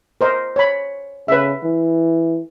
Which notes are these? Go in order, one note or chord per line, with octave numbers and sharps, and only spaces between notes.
A#4 C5 D#5
C#5 B5
C#3 B4 E5
E3